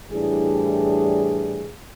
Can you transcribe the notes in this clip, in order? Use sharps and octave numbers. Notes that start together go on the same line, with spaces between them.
A2 E3 G3 D4 G#4